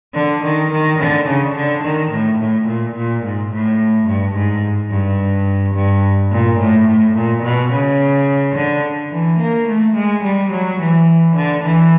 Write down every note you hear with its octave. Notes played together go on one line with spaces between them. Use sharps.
D3
D#3
D#3
D3
C#3
D3
D#3
A2
A2
A#2
A#2
G#2
A2
G2
G#2
G2
G2
A#2
A2
A2
A#2
B2
C#3
D3
E3
A#3
A3
G#3
G3
F#3
E3
D3
E3